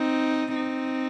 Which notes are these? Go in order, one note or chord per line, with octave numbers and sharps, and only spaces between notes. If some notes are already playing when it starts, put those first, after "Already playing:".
Already playing: C4 D#4
C4 D#4